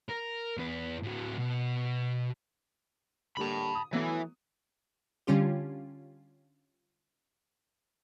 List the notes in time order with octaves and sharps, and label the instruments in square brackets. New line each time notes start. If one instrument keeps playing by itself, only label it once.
[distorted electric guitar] A#4
E2 B4
A2 F#3
B2
[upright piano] D3 G3 A#3 [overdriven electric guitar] A5 B5
[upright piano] D#6
[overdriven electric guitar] E3 [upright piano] F#3 A3 B3
[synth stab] D3 G3 C#4 F4 G4